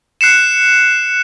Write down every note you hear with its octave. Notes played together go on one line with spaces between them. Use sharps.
F#6 C7 C#7 E7